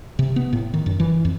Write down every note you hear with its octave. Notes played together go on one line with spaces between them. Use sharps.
C3
B3
A2
D#3
F#2
E3
F2